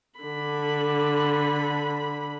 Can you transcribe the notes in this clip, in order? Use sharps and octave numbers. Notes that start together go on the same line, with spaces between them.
D3 B5